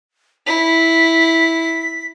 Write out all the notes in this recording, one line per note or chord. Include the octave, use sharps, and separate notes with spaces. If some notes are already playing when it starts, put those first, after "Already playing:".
E4 B6